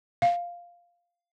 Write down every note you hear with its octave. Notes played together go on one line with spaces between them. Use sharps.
F5